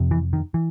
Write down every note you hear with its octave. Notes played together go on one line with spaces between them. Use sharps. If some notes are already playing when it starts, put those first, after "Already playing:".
Already playing: F2 C3
E3
D#3
E3